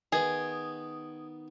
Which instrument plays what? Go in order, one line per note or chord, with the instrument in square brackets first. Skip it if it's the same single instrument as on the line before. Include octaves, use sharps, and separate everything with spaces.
[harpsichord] D#3 B3 [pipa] G#4